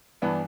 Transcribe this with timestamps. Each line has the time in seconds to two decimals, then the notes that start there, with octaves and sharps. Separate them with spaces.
0.22 G2 E3 B3 D4